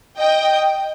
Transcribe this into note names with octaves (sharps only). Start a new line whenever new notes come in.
D#5 G5